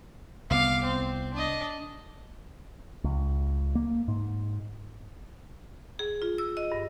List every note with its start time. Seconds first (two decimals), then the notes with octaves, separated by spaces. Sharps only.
0.50 C2 B3 F5 D6
0.84 C4
1.34 D4 D#5
3.04 C#2
3.75 A#3
4.08 G#2
5.99 G#4
6.22 F4
6.38 E6
6.57 D#5
6.72 G2